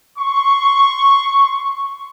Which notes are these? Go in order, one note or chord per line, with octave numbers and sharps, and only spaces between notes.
C6 C#6